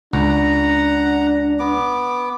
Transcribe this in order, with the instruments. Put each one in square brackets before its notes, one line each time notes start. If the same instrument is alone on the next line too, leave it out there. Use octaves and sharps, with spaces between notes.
[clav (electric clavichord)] C#2 [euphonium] D4 [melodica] F#5 A#5
[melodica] B3 D6